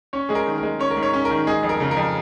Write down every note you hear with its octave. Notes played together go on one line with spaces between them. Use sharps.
C#4 C#5
G#3 G#4
A#4
D#3
G#3 A#4
C#4 C#5
A#4
G#2
C#5
C#4
A#4
D#3
G#3 G#4
F2
A#4
C#3
A#4
F2